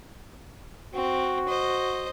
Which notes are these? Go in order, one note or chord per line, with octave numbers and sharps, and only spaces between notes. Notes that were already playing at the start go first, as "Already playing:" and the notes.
C4 F#4
C5 D#5